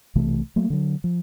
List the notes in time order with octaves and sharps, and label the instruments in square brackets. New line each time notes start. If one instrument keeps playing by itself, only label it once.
[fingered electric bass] B1 C3 E3 A3
F#3 A3 A#3
D3 F#3
F3